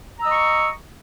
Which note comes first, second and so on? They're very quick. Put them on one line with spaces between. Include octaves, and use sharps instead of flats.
A#5 E6 D#5 C#6